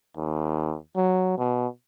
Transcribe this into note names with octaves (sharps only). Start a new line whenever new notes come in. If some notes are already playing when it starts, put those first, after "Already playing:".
D#2
F#3
B2